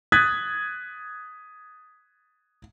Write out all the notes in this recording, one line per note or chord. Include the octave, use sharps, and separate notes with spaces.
D#6 F#6 G#6 A6 B6